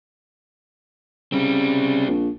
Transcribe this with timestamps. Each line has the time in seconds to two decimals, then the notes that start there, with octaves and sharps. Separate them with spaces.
1.32 C#3 G3 C4
2.08 A#1